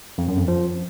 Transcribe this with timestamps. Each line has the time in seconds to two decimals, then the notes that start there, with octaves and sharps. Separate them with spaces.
0.18 F2
0.28 F#2
0.38 F2
0.48 F3